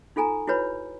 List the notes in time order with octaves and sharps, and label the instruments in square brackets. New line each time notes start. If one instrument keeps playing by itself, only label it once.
[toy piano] D#4 F4 A4 G#5 A#5
E4 F#4 B4 C#5 B5